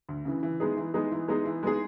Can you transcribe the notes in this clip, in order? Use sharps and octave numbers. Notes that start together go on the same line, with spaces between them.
D2
C#3 E3
E3
G#3 B3 D#4 G#4
E3
G#3 B3 D#4 G#4
E3
G#3 B3 D#4 G#4
E3
G#3 B3 D#4 G#4